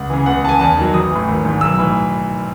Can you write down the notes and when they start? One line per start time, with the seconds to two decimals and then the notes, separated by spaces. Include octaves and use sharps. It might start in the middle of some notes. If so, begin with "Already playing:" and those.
Already playing: C#2 F#5
0.10 C#3 E3
0.26 C#2 F#5
0.43 C#3 E3 A5
0.49 G#5
0.59 E2 A5
0.77 D#3 F#3
0.94 A1 D#6
1.11 A2 E3
1.28 G#1
1.45 G#2 E3
1.61 B1 E6
1.79 A2 E3